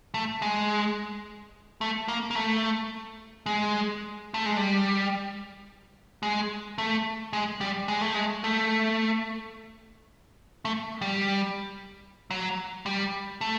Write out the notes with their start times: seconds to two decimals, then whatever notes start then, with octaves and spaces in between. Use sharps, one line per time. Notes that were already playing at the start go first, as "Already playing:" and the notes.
0.14 A3
0.42 G#3
1.81 A3
2.08 A#3
2.31 A#3
2.35 A3
3.46 G#3
4.34 A3
4.46 G#3
4.57 G3
6.23 G#3
6.78 A3
7.33 G#3
7.61 G3
7.88 G#3
8.01 A3
8.15 G#3
8.44 A3
10.65 A3
11.01 G3
12.31 F#3
12.86 G3
13.41 A3